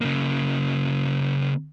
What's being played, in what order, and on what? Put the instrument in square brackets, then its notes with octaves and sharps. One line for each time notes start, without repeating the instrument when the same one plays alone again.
[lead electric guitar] C#3 A#3